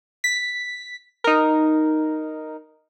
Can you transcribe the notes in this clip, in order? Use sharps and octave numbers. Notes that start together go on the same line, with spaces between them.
B6
D#4 A#4